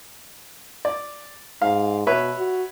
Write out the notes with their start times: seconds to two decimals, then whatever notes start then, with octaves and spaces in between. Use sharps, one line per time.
0.85 D5
1.62 G#2 F5
2.07 B2 B4 C#5 E5
2.38 F#4